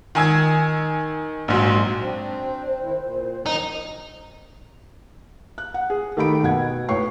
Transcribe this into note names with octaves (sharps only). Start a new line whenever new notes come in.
D#3 G#5 E6 G#6
A#1 G#2 F#3
C4 D4 C5
D#3 E4
A#2
D#3 F#3 C#4 D#4
F#6
F#5
G#4
D#3 A3 G4 G5 B5 D7
B2 F#5 G#6
A2 B4 C#5 G5 C#6 C7